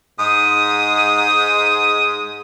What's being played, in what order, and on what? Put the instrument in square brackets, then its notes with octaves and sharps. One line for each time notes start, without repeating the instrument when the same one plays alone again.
[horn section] G#2 G#3 [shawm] D#6